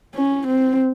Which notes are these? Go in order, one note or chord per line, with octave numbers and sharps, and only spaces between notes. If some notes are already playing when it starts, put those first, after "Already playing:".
C#4
C4